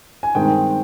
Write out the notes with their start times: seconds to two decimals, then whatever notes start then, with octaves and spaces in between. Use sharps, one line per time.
0.23 G#5
0.35 G2 D#3 G#3 C4 G5